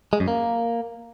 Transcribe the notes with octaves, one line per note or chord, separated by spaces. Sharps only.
G#3
F#2
A#3